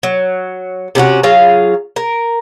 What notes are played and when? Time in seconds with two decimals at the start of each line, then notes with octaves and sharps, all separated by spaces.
0.03 F#3
0.95 C3 C#4 E4 F#4
1.23 F#3 F4 G#4 F5
1.96 A#4